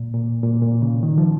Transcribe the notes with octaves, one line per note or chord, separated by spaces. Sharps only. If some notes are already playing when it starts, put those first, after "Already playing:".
Already playing: A#2
A#2
A#2
A#2
C#3
D#3
F3